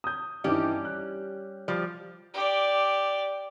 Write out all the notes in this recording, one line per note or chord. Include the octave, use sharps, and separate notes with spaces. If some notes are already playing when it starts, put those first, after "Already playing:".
D#6 G6
G2 E3 G3 C#4 D#4 G4
F#6
F3 G3
G4 D5